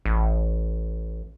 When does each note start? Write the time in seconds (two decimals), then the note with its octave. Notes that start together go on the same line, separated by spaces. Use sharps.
0.05 A1